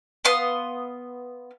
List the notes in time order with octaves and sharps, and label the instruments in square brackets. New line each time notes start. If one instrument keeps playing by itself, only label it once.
[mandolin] B3 F5 C6 D#6